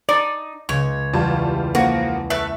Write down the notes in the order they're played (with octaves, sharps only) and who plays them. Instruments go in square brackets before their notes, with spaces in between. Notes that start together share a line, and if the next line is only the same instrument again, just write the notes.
[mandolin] D#4 [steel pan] D5
[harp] C#2 C#3 [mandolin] C#5
[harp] E2 [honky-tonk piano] G3 F4 A5
[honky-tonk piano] F3 A#3 [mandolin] F#4
[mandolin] A3 B4 [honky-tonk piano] E5 [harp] C#6